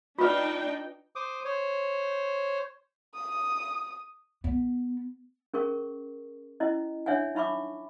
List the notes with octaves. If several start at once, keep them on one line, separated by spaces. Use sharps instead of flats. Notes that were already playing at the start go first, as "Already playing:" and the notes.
D4 D#4 F4 B4 G5
C5 D6 D#6
C5 C#5
D#6
B3
C#4 G#4 A#4 C#6
C#4 E4 D#5
D4 C#5 E5 F#5 G#5
D#4 E5 B5 C#6 D6